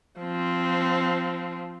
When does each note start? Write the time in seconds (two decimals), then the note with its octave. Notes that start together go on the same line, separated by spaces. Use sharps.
0.20 F3 C4